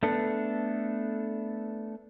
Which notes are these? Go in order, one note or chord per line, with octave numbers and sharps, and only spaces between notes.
A3 B3 D4 A4